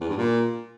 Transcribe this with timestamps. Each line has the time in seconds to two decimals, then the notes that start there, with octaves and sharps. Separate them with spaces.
0.01 E2
0.09 G2
0.17 A#2